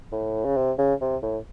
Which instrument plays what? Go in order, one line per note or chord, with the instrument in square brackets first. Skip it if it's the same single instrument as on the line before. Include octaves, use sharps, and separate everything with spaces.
[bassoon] A2
C#3
C3
C#3
C3
A2